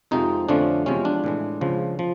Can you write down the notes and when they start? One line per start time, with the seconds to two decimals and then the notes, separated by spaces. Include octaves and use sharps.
0.11 F2 C3 F3 G#3 D#4
0.49 F2 D3 F3 A3 C#4 D4
0.86 E2 C3 F3 G#3 C#4
1.05 D4
1.24 A2 E3 G#3
1.61 C#2 C#3 F3
1.99 F3